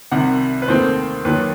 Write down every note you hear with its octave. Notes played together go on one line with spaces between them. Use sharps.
C2 C3 D#3 F#5
B4
D#2 D#3 A3 C4 C5
D#2 D#3 F#3 B4